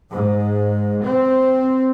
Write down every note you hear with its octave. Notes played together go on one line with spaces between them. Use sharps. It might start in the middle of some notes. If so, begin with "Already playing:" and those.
G#2
C4